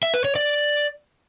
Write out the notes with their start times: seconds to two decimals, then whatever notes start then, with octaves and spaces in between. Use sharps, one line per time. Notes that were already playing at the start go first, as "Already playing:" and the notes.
0.03 E5
0.14 B4
0.25 C#5
0.36 D5